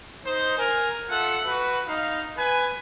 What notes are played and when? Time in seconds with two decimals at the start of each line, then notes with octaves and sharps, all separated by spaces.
0.24 D#4 C5
0.58 A#4 G#5
1.10 F4 A4 E5 F#5
1.45 F#4 B4
1.87 D#4 F5
2.37 B4 G#5